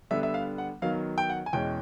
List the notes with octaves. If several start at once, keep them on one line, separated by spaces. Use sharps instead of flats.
D3 G3 B3 D4 E5
E5
F5
F#5
D#3 F#3 B3 F5
G5
F#5
G#5
E2 B2 G#3 C#4 G5